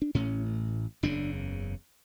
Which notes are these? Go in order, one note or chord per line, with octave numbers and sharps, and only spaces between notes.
D4
A1 A2 C#4
F#1 E2 C#3 D4